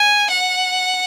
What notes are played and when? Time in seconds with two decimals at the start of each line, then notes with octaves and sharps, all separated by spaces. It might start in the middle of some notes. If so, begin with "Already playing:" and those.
Already playing: G#5
0.30 F#5